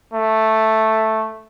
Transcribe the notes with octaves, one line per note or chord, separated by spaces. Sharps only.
A3